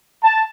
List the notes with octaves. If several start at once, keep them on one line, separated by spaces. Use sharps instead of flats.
A5